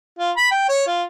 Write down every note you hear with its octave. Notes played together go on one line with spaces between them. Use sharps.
F4
B5
G5
C#5
F4